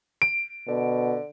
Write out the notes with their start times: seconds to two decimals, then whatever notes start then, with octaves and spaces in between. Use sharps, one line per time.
0.22 D7
0.68 B2 D3